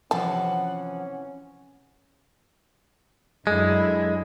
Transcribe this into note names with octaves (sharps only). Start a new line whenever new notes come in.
C3 E3 F3 C#4 F#5 A5
F#2 D3 G#3 E4